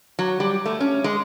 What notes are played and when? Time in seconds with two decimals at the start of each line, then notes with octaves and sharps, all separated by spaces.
0.19 F#3
0.40 G3
0.66 A3
0.80 C#4
1.04 G#3